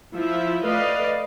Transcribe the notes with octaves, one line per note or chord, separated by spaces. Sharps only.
F3 E4 E5
A3 B4 D5 D#5 F5